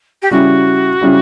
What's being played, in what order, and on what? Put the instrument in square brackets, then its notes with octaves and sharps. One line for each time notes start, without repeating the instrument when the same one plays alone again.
[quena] G4
[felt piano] C#3 G3 C#4 E4 [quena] F#4
[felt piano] C#3 G3 C#4 E4